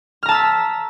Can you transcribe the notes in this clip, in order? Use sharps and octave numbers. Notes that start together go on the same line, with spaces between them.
A5 A#5 E6 F6 B6